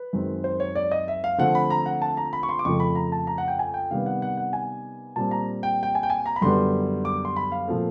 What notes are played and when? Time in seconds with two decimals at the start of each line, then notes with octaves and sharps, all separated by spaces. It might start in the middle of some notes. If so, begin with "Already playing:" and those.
Already playing: B4
0.13 F#2 D#3 G#3 C4
0.44 C5
0.60 C#5
0.75 D5
0.91 D#5
1.08 E5
1.24 F5
1.38 D3 F3 A3 C4 F#5
1.55 B5
1.70 A#5
1.86 F#5
2.02 A5
2.17 A#5
2.33 B5
2.43 C#6
2.49 C6
2.59 D6
2.65 F2 C#3 F3 A3 C#6
2.80 B5
2.95 A#5
3.12 A5
3.27 A#5
3.38 F#5
3.48 G5
3.59 G#5
3.74 G5
3.91 C3 D#3 G3 B3 F5
4.06 F#5
4.22 F#5
4.37 F#5
4.53 G#5
5.16 A#2 G3 C4 A5
5.31 A#5
5.63 G5
5.83 G5
5.95 G#5
6.03 G5
6.10 G#5
6.26 A#5
6.36 B5
6.42 F#2 D3 G3 B3 C6
7.05 D6
7.25 C6
7.36 B5
7.52 F5
7.68 A#2 F3 A3 C4